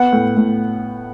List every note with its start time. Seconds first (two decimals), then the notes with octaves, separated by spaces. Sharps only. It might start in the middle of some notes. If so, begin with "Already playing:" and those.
Already playing: B3 F#5
0.12 A2
0.37 A2